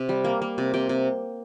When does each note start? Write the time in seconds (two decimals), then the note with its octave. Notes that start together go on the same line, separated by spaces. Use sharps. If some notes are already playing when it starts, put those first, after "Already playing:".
Already playing: C3
0.09 G3
0.24 A#3
0.42 A#3
0.58 C3
0.74 C3 G5
0.89 C3